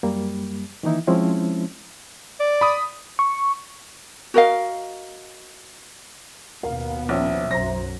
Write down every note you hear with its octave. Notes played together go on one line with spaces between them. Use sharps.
F#2 G3 A#3
D#3 E3 A#3 D#4 E4
F3 G#3 C4 C#4 E4
D5
B5 D#6
C#6
F#4 A#4 D#5 F5
D#2 B2 B3 A#4 F5
A#1 C4 C#4 E5
B1 F#2 F#3 C5 A#5 A#6